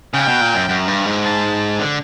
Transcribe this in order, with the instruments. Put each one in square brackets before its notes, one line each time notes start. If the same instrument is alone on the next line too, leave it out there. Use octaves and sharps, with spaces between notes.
[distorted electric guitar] C#3 [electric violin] G5
[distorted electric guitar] B2
A#2
F#2
F#2
G2
G#2
[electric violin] A5
[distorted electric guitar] D3